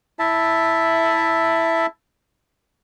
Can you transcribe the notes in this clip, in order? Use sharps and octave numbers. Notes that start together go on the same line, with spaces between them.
E4 E5 A5